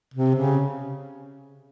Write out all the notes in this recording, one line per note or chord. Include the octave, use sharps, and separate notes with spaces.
C3
C#3